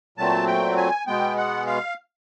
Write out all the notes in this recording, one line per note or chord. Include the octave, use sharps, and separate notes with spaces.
A#2 F#3 A3 C4 A5
G5
G#5
B2 G#3 B3 G5
F#5
F5